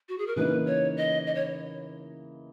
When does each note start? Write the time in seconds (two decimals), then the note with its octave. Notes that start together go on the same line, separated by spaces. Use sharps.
0.09 F#4
0.18 G#4
0.27 A#4
0.36 C#3 E3 A#3 D#4 B4
0.66 C#5
0.97 D#5
1.27 D#5
1.35 C#5